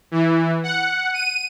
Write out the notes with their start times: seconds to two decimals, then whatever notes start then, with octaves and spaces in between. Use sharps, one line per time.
0.11 E3
0.63 F#5
1.14 D#7